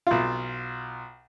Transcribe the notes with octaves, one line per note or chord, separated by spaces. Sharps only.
B1 F4